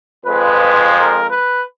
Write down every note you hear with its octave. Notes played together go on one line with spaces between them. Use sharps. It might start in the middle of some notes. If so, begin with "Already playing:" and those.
F2 F3 G#3 B4
A#4
B4